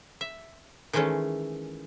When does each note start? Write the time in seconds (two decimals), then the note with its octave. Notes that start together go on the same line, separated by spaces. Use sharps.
0.21 E5
0.93 D#3 E3 G#3 A3 C#4